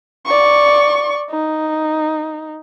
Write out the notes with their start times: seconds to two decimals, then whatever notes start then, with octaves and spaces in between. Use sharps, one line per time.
0.26 D5 C#6
1.30 D#4